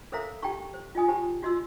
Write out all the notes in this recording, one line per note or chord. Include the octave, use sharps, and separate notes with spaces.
A4 A#4 C5 E5 F5 A#5
G4 G5 A5 A#5 C#6
C5
F4 D#5 G#5 D#6
G4 C5 G5 A5 B5
F4 F#4 D#5 C6 E6